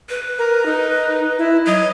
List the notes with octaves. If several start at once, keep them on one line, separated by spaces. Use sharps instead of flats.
B4
A#4
D#4
E4
F#3 D#5